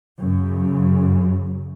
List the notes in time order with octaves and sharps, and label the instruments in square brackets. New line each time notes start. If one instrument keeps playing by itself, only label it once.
[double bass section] F#2 C#3